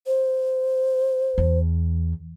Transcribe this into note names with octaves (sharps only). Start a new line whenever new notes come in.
C5
E2